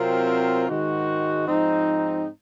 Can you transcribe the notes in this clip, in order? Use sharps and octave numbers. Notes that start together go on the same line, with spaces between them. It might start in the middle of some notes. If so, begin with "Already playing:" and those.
Already playing: C3 F#3 C4 F4 A#4
G#2 D#3 G#3 D#4 F#4
G#2 F3 C4 D#4